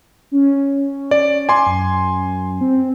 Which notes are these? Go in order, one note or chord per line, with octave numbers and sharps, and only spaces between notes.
C#4
D5
G#5 C6 D6
F#2
C4